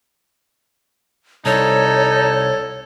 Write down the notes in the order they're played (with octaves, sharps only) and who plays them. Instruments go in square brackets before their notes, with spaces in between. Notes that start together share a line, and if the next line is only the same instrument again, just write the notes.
[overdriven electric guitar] C2 [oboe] D#4 [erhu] A4 [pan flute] C#5